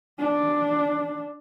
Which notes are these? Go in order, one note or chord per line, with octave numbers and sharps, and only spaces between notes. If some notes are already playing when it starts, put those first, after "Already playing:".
D4